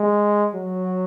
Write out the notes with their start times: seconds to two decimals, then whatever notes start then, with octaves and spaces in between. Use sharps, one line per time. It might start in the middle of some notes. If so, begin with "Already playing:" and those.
Already playing: G#3
0.55 F#3